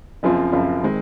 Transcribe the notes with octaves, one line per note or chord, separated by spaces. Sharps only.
F#1 F#2 F3 C4 F4
F#1 F#2 F3 C4 F4
D#3 G#3 C4